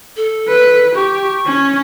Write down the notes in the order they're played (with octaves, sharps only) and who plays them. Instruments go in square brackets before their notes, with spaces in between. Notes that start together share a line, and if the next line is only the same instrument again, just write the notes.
[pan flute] A4
[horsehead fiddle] B4
[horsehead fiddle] G4 [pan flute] C#6
[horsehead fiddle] C#4